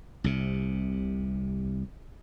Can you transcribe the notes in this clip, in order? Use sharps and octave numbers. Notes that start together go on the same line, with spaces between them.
C2 C3